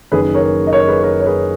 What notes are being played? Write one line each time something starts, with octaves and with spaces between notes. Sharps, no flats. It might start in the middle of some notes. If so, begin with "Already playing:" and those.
F#1 F#2 D#3 G#4 B4
A#4 C#5
D#5
A#4 C#5
G#4 B4
A#4 C#5
C#5
G#4 B4